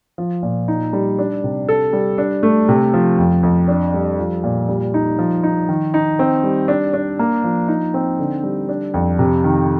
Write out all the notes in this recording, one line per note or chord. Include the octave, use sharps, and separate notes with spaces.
F3
A#2
D#4
G3
D4
C3
A4
G3
D4
A3
C3
F3
F2
F2
D4
G3
F3
A#2
G3
D#4
F3
D#4
D#3
D#4
C4
G3
D4
D4
A#3
F3
D#4
C4
D3
G3
D4
F2
C3
D#3